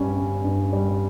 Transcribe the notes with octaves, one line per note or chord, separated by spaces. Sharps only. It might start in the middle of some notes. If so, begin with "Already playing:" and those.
Already playing: G2 G3 C#4
C#4
G2
G3